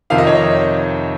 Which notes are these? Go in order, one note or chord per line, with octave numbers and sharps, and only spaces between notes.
F2 C3 D#3 F5
D#5
C#5
D#5